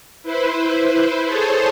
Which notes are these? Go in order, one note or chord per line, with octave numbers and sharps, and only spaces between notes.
E4 B4 C5
G#4 A4 C5 C#5 A5